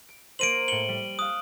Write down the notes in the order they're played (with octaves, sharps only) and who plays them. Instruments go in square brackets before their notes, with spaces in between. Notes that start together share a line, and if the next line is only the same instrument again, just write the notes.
[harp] D7
[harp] A#3 A#4 C5 [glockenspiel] D7 D#7 F#7
[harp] A2 C#7 [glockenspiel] F#7 G7
[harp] G3
[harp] F5 F#6 [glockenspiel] D#6